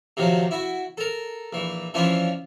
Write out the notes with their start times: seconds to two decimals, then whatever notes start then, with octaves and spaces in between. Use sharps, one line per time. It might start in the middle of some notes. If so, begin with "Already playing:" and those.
0.17 C3 D#3 F3 F#3
0.51 E4 F#4
0.98 A4 A#4
1.53 A#1 E3
1.94 E3 F3 C#4 D4 E4 F4